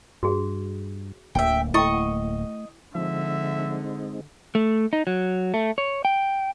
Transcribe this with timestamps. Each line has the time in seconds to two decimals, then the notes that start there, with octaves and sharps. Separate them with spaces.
0.23 G2 F#4 G#4
1.35 D1 D2 A#3 E5 G5
1.74 A3 E4 D#5 G5 C#6
1.94 F#5
2.95 D3 F3 G#3 C4 D#4 E5
4.55 A3
4.93 D#4
5.07 F#3
5.54 A3
5.78 C#5
6.05 G5